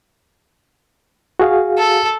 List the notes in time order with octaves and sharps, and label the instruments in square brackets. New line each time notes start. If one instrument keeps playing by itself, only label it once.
[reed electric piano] F#4 G#4 F5
[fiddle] A4